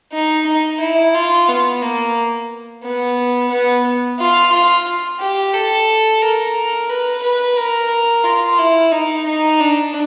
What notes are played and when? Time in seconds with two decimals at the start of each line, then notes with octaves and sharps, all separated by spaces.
0.13 D#4
0.47 D#4
0.80 E4
1.15 F4
1.48 B3
1.82 A#3
2.84 B3
3.51 B3
4.19 F4
4.52 F4
5.20 G4
5.54 A4
6.22 A#4
6.90 B4
7.23 B4
7.57 A#4
8.24 F4
8.59 E4
8.92 D#4
9.26 D#4
9.60 D4